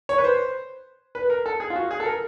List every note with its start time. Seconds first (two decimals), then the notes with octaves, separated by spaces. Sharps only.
0.09 C#5
0.18 B4
0.24 C5
1.15 B4
1.30 A#4
1.46 A4
1.60 G#4
1.70 F4
1.75 F#4
1.91 G#4
2.00 A4
2.05 A#4